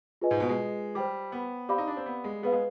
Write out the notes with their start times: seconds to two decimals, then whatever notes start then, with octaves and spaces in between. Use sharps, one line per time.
0.21 F4 G#4 B4 D#5 G#5
0.31 G#2
0.40 B2
0.49 G#3
0.95 G3 C5 G5 D6
1.32 B3
1.69 C4 G4 D5 F5 B5 D6
1.78 D#4
1.87 D4
1.97 C4
2.06 B3
2.24 G#3
2.42 B3 G#4 B4 F5
2.52 G#3